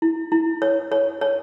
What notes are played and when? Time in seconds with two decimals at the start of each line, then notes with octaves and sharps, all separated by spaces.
0.02 E4
0.32 E4
0.62 C#5
0.92 C#5
1.21 C#5